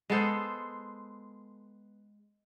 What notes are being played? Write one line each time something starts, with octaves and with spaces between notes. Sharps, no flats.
G#3 B3 A4 C5